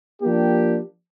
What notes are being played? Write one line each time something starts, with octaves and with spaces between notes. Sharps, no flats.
F3 A#3 D4 G4